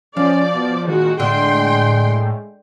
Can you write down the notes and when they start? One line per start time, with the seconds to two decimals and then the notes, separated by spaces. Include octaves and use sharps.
0.17 F3 C#4 D5 F5
0.53 B2
0.87 A#2 D#3 G#3 F#4
1.20 A2 D3 G#3 G5 C6